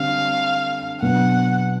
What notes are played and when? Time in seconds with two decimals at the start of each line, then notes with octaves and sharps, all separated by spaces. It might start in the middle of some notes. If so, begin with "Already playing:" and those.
Already playing: D3 G3 C4 F5
1.02 B2 F#3 B3 D4 F#5